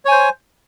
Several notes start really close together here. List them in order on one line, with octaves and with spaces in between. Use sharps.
C#5 G#5 C5